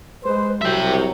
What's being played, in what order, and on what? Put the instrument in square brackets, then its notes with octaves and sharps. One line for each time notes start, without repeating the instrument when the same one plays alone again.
[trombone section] G#3 C5 [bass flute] B4
[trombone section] C2 [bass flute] F#3 [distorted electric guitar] E5 G5